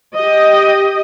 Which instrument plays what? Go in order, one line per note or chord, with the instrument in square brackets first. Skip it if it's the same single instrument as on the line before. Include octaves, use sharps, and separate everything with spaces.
[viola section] G4 D#5